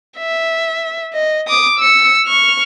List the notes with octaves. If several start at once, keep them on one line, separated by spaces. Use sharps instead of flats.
E5
D#5
D6 D#6
E6 C#7
C#6 F6